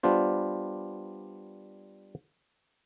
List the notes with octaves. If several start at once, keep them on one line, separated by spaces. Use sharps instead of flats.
G3 B3 D4 F4 C5